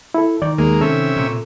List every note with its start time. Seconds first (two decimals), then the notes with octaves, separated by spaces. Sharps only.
0.14 E4 A4
0.42 D#3 D5
0.58 D#2 G#3 A#3
0.81 C3 C#4 A4 E5
1.16 A#2